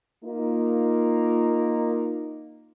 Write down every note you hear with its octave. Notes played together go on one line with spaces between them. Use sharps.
A#3 D#4 F4